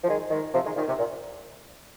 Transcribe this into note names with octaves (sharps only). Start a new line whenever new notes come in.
F3
D#3 G#3
D#3 G#3
C3 F3
D#3 G#3
A#2 D#3
C3
A#2